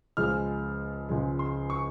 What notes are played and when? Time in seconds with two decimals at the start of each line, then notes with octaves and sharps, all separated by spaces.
0.17 C#2 C#3 F3 G#3 F6
1.09 C#2 C#3 F3 G#3
1.39 C6
1.70 C#6